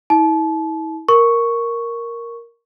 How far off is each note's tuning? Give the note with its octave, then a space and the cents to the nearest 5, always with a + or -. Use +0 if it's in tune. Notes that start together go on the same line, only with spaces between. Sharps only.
E4 -40 A5 -35
A#4 +0 C#6 +0